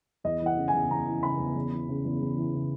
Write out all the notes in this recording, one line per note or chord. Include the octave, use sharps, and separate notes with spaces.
E2 D#5
E3 F#5
C#3
G#5
E2
E2 A#5
E3
C#3 B5
E2
E2
E3
C#3
E2
E2
E3
C#3